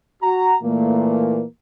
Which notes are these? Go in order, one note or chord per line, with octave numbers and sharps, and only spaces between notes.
F#4 A#5
A#2 E3 A3 A#3